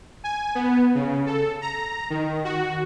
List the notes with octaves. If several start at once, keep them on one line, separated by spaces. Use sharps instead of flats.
G#5
B3
C#3
A4
A#5
D#3
F#4